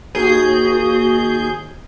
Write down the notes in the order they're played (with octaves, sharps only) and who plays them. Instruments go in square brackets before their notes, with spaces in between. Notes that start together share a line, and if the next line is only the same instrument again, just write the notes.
[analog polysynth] D#2 G#4 G6 [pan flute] F#4